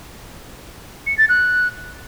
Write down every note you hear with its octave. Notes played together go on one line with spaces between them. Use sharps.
C#7
A6
F#6